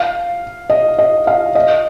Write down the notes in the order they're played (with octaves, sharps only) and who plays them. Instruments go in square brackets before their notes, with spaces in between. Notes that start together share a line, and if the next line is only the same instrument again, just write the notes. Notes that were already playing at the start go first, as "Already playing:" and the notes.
Already playing: [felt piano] F5
D#5
D#5
F5
D#5